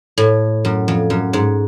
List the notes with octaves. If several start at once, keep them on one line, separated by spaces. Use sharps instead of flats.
A2
F#2
F2
F#2
G#2